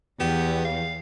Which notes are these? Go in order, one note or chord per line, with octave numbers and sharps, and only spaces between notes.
E2 B3 G4
F5